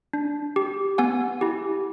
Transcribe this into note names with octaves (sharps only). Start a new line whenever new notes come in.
D4
G4
B3 F#5 G#5
E4 G4